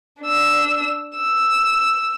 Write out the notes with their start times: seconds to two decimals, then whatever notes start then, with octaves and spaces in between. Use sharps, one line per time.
0.21 D4 E6
1.17 E6